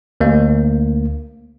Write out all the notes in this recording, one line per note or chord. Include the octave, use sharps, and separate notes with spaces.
D2 A#3